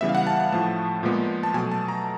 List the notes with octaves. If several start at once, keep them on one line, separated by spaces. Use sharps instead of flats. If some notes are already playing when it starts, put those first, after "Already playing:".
C#3 E3 G3 B3 E5
F5
F#5
A5
A5
A2 F3 A3 A5
A#2 F3 G#3 B3
A5
B2 F#3 A3 G#5
A5
A#5